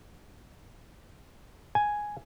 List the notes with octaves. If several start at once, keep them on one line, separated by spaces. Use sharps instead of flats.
G#5